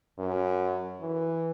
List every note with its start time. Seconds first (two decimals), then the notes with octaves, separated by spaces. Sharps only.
0.19 F#2
1.01 E3